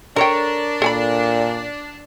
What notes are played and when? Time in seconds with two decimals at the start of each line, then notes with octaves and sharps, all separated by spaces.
0.16 D4 A4 A#4 C#5 G5
0.82 A#2 A4 G#5 B5